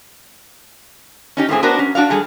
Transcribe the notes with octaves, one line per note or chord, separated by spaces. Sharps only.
C#4 D#4 G4
A2 A#3 C4 G#4
B3 D4 F#4 A#4 C5
C#4
D4 F#4 D5 F5
G3 G#4 A4